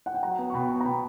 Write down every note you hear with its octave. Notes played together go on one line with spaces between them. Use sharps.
F#5
G5
F#3 F#5 A#5
B3
C#6
B2 G5 B5
B3
A#5
B2 G5 B5